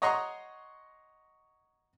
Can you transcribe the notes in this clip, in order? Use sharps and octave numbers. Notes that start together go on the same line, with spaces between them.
C#5 D#5 F#5 A#5 C6 C#6